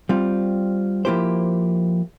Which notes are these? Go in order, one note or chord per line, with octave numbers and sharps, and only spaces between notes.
G3 C4 F4
F3 A#3 E4 G4 C5